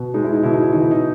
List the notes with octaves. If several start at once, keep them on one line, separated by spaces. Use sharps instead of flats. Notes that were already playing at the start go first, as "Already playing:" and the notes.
Already playing: B2
G#3 D#4
E4
D#4
B2 E4
D#4
E4
E3 D#4
E4
D#4